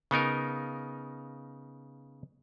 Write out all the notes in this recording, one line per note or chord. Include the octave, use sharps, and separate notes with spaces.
C#3 B3 D#4 A#4